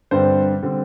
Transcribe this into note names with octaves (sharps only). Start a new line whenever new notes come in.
G2 D3 G3 C4 C5
D3 G3 C4